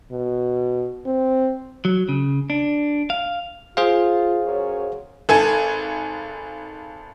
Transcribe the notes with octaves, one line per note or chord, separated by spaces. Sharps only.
B2
C4
F#3
C#3
D4
F5
F4 G#4 C5 F5
F#2 C#5
G#1 A4 G#5